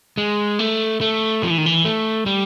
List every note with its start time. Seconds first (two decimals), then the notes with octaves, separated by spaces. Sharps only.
0.18 G#3
0.59 A3
1.01 A3
1.43 F3
1.50 E3
1.58 D#3
1.66 E3
1.85 A3
2.26 G3